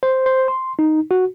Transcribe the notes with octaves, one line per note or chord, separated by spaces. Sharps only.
C5
C5
C6
D#4
F#4